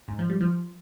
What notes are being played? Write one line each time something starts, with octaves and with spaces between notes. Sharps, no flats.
G#2
F3
G3
F3